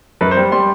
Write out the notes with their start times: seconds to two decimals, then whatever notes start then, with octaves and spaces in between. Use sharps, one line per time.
0.21 F#2 B4
0.31 C5
0.37 G3
0.52 G3 C6